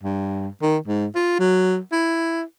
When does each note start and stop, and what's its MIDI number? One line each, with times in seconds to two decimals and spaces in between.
0.03 0.48 43
0.62 0.78 51
0.87 1.06 44
1.15 1.37 65
1.39 1.79 54
1.92 2.42 64